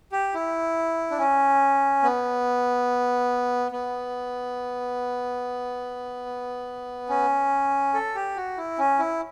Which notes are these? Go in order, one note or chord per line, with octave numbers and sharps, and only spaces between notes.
G4
E4
D4
C#4
B3
B3
C#4
A4
G4
F#4
E4
C#4
E4